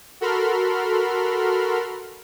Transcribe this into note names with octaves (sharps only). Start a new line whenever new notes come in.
F#4 A4 A#4 B5 C6 F6